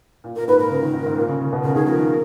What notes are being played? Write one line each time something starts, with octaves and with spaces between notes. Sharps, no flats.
A#2
A#2 A#4
G#2 B4
A#2 A#4
C#3
D#3
G#2
G#2
A#2
C#3
C#3
B2
C#3 A#4
D#3 G#4
F3 A#4
D#3